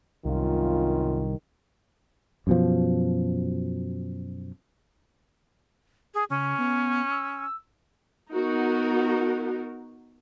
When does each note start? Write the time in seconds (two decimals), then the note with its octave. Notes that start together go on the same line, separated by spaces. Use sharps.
0.25 C2 F#2 D#3 F4
2.47 F#2 B2 F3
6.14 G#4
6.30 C#3 C#4
6.58 B3
7.10 E6
8.32 B3 D#4 F#4 A#4